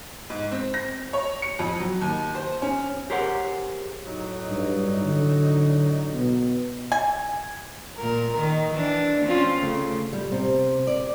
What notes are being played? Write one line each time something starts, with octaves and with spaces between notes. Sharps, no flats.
G#2
C4
A#6
C#5
C#7
F2
F#3
D#2
C5
C#4
G4 G#4 A#4 C5 C#5 F#5
A2 F#3 D#4
G2
D3
B2
G#5
A#2 A#4
D#3
E3 D4
C4 C#4 F4
C#3 A3
G3
C3
D5